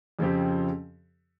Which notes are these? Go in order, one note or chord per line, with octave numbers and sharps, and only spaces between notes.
F2 C#3 F3 C4 G4